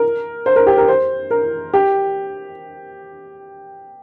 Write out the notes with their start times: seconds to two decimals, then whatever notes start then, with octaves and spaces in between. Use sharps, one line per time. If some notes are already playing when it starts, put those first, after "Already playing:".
Already playing: A#4
0.46 C5
0.56 A#4
0.67 G4
0.77 A#4
0.88 C5
1.31 A#4
1.74 G4